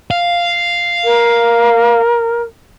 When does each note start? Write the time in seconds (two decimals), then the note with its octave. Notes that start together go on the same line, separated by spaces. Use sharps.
0.11 F5
1.04 A#4